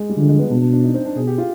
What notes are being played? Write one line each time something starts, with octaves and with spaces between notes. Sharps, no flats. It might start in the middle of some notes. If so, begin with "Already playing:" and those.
Already playing: G#3
G3
D3 F3
G#3
B3
B2 D4
D4
D4
D#4
C4
D4
B2 G#4
G4
F4